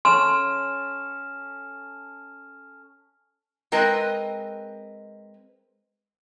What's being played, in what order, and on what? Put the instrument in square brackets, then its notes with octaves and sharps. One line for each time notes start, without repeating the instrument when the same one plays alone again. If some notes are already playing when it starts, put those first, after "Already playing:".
[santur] C#4 A4 [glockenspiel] G#5 F6 E7 [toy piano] C6
[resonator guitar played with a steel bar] G#3 C4 A#4 B4 D#5